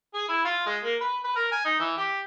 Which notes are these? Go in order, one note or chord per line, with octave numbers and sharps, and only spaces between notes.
G#4
E4
F4
G#3
A#3
B4
B4
A#4
G#5
D#4
E3
G4